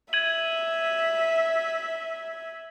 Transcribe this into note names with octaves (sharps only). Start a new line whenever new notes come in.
E5 G#6 D#7 F#7